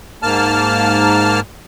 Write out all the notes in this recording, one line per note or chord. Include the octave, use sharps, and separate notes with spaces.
G#2 A#3 A5 F6